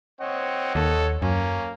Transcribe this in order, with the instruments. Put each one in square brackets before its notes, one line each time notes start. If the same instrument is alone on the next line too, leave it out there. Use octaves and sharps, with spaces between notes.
[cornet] C4 [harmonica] C#5 D#5 F#5
[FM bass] D#2 [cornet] A4
[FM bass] F#2 [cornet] A#3 [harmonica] C#4